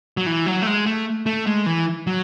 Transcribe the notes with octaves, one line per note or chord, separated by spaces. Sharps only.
F#3
E3
F#3
A3
G#3
A3
A3
G#3
E3
F#3